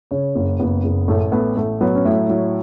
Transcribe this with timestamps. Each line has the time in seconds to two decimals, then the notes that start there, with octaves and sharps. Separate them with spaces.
0.11 C#3 C#5
0.35 F#1
0.60 F#1 B3
0.84 F#1
1.08 A1 A3
1.32 A3 B3
1.57 A1 A3
1.81 F#3 B3
1.95 C#4
2.05 A2 E4
2.29 F#3